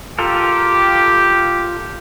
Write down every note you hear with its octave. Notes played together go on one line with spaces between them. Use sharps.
F4 G4 A4 A#4